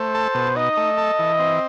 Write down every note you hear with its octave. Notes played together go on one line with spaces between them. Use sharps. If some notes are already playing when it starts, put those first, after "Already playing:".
Already playing: A3 C5
A4
B2
D#4 D#5
A3
A4
E3
C4